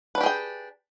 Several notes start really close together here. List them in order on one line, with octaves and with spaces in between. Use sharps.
B4 D4 G4 G#4 G5